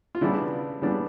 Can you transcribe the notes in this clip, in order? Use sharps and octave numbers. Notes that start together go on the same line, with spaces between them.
F4
C#3 E3 G3 B3 D4 E4
C#3 E3 G3 B3 D4